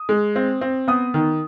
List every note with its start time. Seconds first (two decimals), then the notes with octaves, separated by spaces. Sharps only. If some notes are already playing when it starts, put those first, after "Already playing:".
Already playing: D#6
0.09 G#3
0.36 C4
0.61 C4
0.88 B3 D#6
1.14 D#3